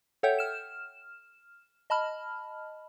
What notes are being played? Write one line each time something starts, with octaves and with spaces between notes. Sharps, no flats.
A4 C#5 E5 F#5 G5 G6
F6 E7
D#5 A5 B5 F6